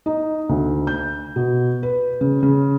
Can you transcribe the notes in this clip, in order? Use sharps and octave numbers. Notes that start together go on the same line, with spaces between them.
D#4
D2
G6
B2
B4
C#3
C#3